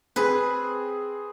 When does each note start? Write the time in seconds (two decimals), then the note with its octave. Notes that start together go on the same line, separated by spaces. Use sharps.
0.16 C4 G#4 B4